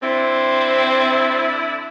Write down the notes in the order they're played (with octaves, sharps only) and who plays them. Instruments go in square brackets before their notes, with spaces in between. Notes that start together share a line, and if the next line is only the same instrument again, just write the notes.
[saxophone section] D3 E4 [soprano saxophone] C4